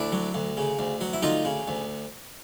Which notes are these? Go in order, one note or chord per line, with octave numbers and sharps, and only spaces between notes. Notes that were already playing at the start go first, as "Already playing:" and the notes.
Already playing: D2 D4 E4
F#3
D2
C#3
D2
F#3
E4
D2 D#4 F4
C#3
D2